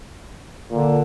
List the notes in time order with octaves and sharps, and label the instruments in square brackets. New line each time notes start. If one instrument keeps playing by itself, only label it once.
[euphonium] A#2 [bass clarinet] D3